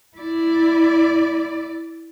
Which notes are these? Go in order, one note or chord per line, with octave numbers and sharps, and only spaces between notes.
E4 D5